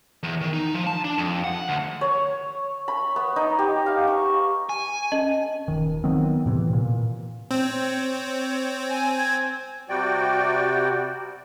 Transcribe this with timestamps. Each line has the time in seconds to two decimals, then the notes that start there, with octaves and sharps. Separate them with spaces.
0.23 E2
0.41 D#3
0.53 D#4
0.74 F3
0.87 A5
1.04 D4
1.18 F2
1.44 F#5
1.69 D2
2.01 C#5
2.88 B5
3.16 B3
3.36 D#4
3.59 G4
3.86 F5
4.07 C#6
4.69 G#5
5.12 C#4 D#5
5.68 D#1 D#3
6.04 D#3 F#3 B3 C4
6.46 A2 C3 E3
6.73 A#2
7.51 C4 C#5
8.89 G#5
9.18 G#6
9.89 C3 G3 F#4 D5 G5